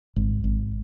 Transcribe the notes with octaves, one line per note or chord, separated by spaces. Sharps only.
G#1
G#1